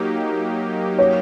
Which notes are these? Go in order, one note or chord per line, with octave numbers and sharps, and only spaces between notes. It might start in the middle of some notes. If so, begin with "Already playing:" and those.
Already playing: F#3 A#3 D#4 G4
C#5